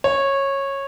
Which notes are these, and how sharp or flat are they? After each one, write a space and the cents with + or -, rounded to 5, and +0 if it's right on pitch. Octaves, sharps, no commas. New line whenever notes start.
C#5 -15